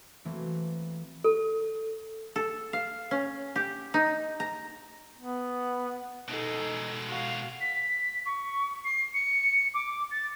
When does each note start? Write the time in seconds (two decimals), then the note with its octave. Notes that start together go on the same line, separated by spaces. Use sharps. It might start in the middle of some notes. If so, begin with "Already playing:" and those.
0.25 E3 F#3 A3 A#3 C4
1.24 A4
2.36 A4
2.73 F5
3.11 C#4
3.56 G4
3.94 D#4
4.40 A#5
5.18 B3
6.28 B2 G#3 D#4 A4
7.07 F#4 F5
7.61 B6
8.26 C#6
8.85 C7
9.14 C#7
9.74 D6
10.11 A6